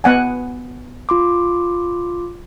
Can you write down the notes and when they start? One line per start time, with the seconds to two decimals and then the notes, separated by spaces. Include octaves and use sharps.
0.04 B3 F#5 G#5
1.09 F4 C6 D6